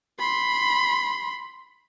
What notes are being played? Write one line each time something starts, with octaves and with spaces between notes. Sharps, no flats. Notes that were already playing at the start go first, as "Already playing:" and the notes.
B5 C6